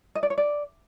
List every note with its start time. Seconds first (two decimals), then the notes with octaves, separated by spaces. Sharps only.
0.15 D#5
0.23 D5
0.30 C#5
0.38 D5